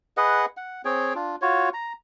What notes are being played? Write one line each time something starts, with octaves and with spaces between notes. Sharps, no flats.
G#4 B4 D#5 F#5
F#5
C4 G#4 C#5 G5
D4 F4
F4 F#4 C#5
A#5